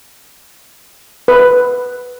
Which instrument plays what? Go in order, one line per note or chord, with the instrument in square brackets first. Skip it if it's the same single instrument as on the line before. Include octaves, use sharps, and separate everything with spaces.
[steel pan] B4